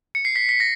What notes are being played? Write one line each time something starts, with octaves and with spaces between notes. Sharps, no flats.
C#7
C7
B6
B6
A#6